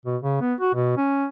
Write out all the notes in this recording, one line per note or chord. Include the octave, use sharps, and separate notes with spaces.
B2
C#3
B3
F#4
B2
C#4